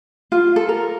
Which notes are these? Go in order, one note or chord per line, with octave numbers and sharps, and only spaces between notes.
F4
A4
A#4